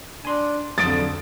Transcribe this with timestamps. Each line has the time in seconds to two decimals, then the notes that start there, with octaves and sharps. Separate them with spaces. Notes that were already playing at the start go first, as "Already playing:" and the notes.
0.25 D4 G#5 C6
0.78 F2 D3 F#3 C4 A4 D#6 A6 D7